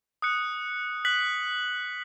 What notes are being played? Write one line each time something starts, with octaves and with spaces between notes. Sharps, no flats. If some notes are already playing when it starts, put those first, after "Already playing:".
D#6 F#6 C#7
F#6 B6 F#7